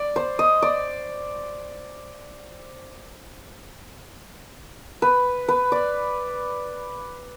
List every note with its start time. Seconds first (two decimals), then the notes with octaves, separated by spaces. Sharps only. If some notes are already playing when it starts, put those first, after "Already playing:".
Already playing: D5
0.16 C5
0.39 D#5
0.62 D5
5.02 B4
5.48 B4
5.72 D5